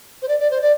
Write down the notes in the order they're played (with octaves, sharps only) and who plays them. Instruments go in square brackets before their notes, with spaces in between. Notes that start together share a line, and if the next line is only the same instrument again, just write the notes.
[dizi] C5
D5
D5
C5
D5